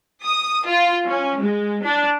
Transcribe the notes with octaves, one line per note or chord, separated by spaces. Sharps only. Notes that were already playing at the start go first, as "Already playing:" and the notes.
D#6
F4
C#4
G#3
D4